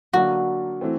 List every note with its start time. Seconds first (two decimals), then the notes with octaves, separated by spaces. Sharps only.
0.13 D3 F#3 A#3 D4 F#4
0.81 E3 A3 C4